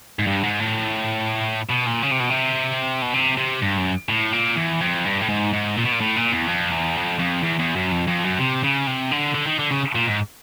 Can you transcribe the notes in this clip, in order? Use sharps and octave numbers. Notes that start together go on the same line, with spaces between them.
G#2
G2
G#2
A2
B2
A#2
C#3
C3
B2
C3
B2
C3
C3
G2
F#2
A2
A#2
E2
F2
G2
A2
G#2
G#2
A#2
B2
A#2
A2
A#2
E2
F2
E2
F2
F2
E2
E2
F#2
F2
F2
F#2
C3
C#3
C3
D3
D3
D#3
D3
C#3
A#2
G#2